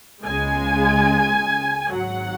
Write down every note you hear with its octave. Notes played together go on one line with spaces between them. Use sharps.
C#2 C#3 G#3 G#5
G#1 G#2 F#3 F#5